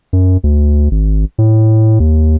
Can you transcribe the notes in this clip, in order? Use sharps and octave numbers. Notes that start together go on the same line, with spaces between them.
F#2
D2
G#1
A2
D#2